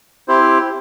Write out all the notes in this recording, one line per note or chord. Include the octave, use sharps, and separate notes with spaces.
C4 E4 G4 C5